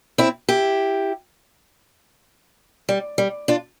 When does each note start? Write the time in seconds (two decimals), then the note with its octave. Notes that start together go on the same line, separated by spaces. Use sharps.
0.18 C4 E4
0.49 E4 G4
2.89 G3
3.18 G3
3.48 D4 F4